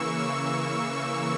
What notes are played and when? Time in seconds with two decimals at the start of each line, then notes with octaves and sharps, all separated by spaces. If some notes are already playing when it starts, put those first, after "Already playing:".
Already playing: C#3 E3 A#3 C#6 E6
0.19 E6